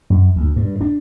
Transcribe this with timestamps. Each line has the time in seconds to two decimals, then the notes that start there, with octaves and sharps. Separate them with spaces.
0.10 F#2
0.36 D2
0.56 G2
0.81 D4